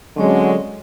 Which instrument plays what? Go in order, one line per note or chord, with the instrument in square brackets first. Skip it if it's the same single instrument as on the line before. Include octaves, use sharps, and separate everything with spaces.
[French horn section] D3 G#3 [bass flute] F#3 [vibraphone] C4 C#4 C#5